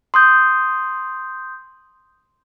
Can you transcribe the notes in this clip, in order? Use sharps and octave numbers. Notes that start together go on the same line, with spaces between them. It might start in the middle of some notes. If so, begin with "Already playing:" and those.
C6 D#6 G6